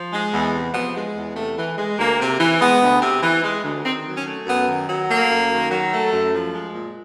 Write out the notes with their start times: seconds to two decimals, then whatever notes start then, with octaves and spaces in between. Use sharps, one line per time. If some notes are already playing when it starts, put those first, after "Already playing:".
Already playing: F3
0.13 G#3
0.34 E2
0.55 C3
0.74 F3 B3
0.96 G#3
1.17 E2
1.36 C3 A3
1.58 E3
1.78 G#3
1.99 D2 A#3
2.20 C3
2.40 E3
2.61 G#3 B3
2.81 D2
3.02 C3
3.23 E3
3.44 G#3
3.64 D2
3.85 D#3 C4
4.06 F#3
4.16 C#4
4.27 A3
4.47 F#2 B3
4.68 D#3
4.89 F#3
5.09 A3 A#3
5.30 F#2
5.51 D#3
5.71 F#3
5.93 A3
6.13 F#2
6.34 F3
6.54 G#3
6.75 A#2